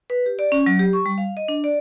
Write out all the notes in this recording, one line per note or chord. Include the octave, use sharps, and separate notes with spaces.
B4
G4
D5
C#4
F#3
G4
C#6
G3
F5
D#5
D4
D5